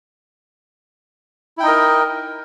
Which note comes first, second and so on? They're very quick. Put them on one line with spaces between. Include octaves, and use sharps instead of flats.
E4 G5 D#4 D#5 A#4